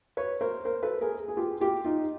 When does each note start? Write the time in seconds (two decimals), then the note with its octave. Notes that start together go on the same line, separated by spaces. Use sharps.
0.17 B4 C#5
0.41 A#4 C5
0.65 A#4 C5
0.83 A4 B4
1.01 G#4 A#4
1.28 G#4
1.37 F4 G4
1.61 F4 G4
1.85 D#4 F4